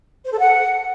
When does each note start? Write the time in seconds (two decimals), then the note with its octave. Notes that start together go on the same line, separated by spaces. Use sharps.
0.24 C5
0.31 A4
0.38 F#5